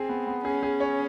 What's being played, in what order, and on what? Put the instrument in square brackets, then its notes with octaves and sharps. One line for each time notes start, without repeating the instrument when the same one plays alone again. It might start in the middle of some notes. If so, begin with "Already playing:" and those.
Already playing: [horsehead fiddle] C4 [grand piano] G#4
[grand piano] B3
B3
[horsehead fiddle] C#4 [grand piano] G#4
[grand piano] G#4
C#5